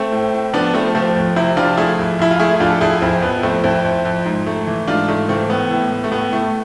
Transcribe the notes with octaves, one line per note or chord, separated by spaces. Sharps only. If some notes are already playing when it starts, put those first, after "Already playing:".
Already playing: A3 C4
A2
A2
F3 B3 D4
F3 A3 C4
F3 A3 C4
F2
C3 C4 E4
F3 D4 F4
A3 E4 G#4
F2
F2 E4
F4
A3 E4 G#4
F2 D4 F4
A4
F2 E4 G#4
F2 C4 E4
F2 B3
F2 A3 C4
F2 C4 E4
F2
F2
G#2
A3
E3
G#2 D4 F4
G#2 A3
E3 A3 C4
A2 B3
A2
A2
A3
A2 B3
A2 A3